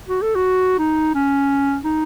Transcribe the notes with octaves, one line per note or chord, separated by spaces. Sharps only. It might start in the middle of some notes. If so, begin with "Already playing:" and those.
F#4
A4
F#4
D#4
C#4
D#4